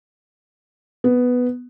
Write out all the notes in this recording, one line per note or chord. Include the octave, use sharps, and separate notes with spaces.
B3